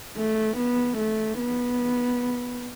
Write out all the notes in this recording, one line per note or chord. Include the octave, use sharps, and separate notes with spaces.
A3
B3
A3
B3